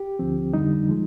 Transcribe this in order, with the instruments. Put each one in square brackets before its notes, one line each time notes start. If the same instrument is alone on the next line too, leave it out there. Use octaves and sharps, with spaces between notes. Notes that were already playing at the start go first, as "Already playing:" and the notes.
Already playing: [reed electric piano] G4
D2 D3 F3 C4
F2 D3 G3 D#4
F3 G#3